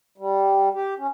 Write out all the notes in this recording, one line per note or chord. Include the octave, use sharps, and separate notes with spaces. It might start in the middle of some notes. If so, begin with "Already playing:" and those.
G3
G4
C#4